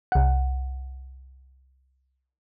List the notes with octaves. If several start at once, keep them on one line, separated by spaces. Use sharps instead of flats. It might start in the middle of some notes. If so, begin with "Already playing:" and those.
C2 F#5